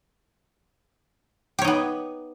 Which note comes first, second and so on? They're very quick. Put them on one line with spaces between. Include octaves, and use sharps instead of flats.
G4 C#5 D#4 B3